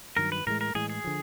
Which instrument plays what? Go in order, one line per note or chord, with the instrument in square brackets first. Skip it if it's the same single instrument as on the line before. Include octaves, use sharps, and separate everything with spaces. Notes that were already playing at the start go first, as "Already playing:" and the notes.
[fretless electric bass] G2 D#3 F#3 [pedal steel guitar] A#4
[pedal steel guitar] B4
[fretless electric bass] A2 E3 G#3 [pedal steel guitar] A#4
[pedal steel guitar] A#4
[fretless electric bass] A2 E3 G#3 [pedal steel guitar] G#4
[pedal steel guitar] G#4
[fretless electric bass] D3 F3